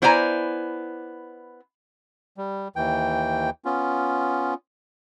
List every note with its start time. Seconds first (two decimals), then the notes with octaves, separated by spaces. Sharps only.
0.02 B3 E4 C5 D5 G#5 A#5
2.37 G3
2.76 D#2 E3 G5
3.65 B3 C#4 F4